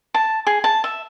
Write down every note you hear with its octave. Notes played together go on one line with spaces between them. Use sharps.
A5
G#4
A5
E5